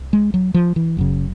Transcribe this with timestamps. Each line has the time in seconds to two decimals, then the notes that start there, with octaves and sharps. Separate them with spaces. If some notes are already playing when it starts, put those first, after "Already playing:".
Already playing: C2
0.13 G#3
0.34 F#3
0.54 F3
0.76 E3
0.97 F#1 F#2 C#3